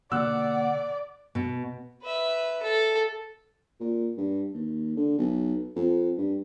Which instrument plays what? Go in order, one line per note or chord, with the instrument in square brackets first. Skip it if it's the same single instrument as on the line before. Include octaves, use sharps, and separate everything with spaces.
[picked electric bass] B2 D3 A#3 [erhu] D5 [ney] F#5 [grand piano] E6 F#6
[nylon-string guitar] B2
[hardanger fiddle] B4 E5
A4
[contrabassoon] A#2
G2
D#2
D3
B1
F2
G2